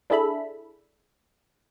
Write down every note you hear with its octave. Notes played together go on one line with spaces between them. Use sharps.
D4 E4 G#4 A4 E5 B5